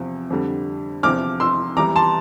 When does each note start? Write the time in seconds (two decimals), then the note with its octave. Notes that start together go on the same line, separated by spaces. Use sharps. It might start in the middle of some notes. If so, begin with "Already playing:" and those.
Already playing: E2 C3 F3
0.30 F2 D3 G3
1.03 E2 C3 F3 D6 F6
1.40 C6 E6
1.76 E2 E3 G3 A#5 D6
1.96 A5 C6